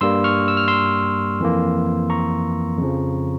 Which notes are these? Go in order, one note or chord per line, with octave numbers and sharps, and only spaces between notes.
G2 G3 A#3 C6 E6
C#6 F6
E6
F6
C6 E6
F2 E3 A#3
A#5 C#6
F2 C#3 F3